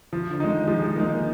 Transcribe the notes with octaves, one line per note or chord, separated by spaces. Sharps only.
F3
D3
D#3 G#3 D#4
F3 G#3
G#3
G#3 A#3 D#4
A#3